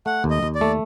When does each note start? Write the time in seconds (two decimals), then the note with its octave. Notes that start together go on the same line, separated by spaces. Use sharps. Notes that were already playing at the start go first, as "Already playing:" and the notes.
0.06 A3 F#5
0.24 D#2
0.30 D#5
0.43 D#2
0.55 D5
0.61 A3